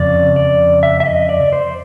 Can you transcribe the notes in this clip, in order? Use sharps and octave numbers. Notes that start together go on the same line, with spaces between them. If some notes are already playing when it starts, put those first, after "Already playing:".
Already playing: F2 C#3 D5
D5
E5
E5
D#5
D5
C5